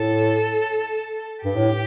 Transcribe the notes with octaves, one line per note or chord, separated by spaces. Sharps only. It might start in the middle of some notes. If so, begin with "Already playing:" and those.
Already playing: A2 A4
G2 G4
A2